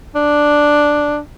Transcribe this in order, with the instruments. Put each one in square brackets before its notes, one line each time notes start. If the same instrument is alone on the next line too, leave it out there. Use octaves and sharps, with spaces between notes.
[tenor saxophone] D4